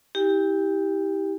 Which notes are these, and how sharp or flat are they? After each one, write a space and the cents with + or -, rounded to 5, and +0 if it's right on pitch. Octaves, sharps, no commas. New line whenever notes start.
E4 -40 G4 +0 G5 +45